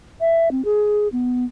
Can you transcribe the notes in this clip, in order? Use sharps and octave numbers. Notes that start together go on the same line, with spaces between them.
E5
C4
G#4
B3